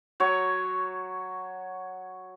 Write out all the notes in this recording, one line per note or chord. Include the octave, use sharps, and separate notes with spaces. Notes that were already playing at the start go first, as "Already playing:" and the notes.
F#3 C#5